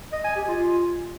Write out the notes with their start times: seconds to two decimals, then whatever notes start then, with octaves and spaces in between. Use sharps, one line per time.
0.12 D#5
0.24 G#5
0.36 G4
0.48 F4